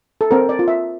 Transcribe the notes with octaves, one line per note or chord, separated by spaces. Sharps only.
A4
C4 A#4
D5
F4
E5